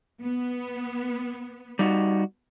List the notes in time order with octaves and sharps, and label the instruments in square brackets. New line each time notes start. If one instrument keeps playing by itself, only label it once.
[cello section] B3
[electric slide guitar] G3 D#4 F#4